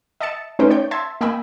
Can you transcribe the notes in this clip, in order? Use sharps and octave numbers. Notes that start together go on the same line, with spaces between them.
D#5 E5 A5 A6 C#7 E7
A3 C#4 D#4 B4 C5 G5
C#5 D5 G5 G6
E5 A5 C6 G#6 A6
A#3 D#5 G5 G#5 B5 E6